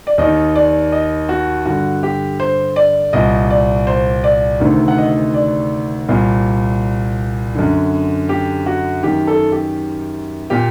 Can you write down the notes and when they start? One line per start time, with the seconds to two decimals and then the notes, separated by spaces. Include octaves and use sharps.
0.07 D5
0.18 D#2 D#3 D#5
0.55 D5
0.92 D#5
1.29 F#4
1.66 G2 D3 F#4
2.03 G4
2.40 C5
2.76 D5
3.13 C2 A#2 D#5
3.50 D5
3.87 C5
4.24 D5
4.60 D2 C3 D#3
4.88 F#5
4.98 D#5
5.34 D5
6.09 C2 A#2
7.55 F#2 D3
8.29 G4
8.66 F#4
9.03 F#2 D#3 G4
9.27 A4
9.52 G4
10.50 A#2 G4